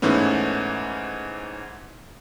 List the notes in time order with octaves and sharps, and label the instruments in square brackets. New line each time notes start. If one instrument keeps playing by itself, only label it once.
[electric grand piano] G#2 E3 A3 B3 C#4